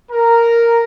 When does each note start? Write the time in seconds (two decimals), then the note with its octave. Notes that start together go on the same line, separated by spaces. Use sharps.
0.10 A#4 A#5